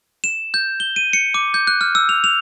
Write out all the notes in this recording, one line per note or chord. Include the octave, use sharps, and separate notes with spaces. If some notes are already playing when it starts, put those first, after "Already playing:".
E7
G6
G7
D#7
C#7
D6
G6
F#6
F6
E6
F7
F7